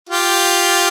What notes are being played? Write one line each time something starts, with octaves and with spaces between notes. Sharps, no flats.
F4 G4